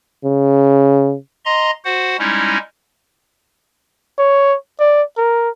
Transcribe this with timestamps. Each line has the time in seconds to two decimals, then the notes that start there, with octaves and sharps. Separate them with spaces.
0.24 C#3
1.45 D#5 A#5 C6
1.85 F#4 C5 F#5
2.19 G3 G#3 C#4 D#4 E4
4.18 C#5
4.80 D5
5.17 A#4